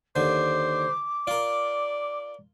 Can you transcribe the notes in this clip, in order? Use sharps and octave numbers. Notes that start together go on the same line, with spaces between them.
D#2 D3 C5 D6
F4 A#4 D5